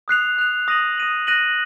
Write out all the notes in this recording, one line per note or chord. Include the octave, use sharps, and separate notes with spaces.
D#6 F#6 C7 F7
D#6 F#6 C7 F7
D#6 A#6 D#7 F#7
D#6 A#6 D#7 F#7
F#6 A#6 D#7 F#7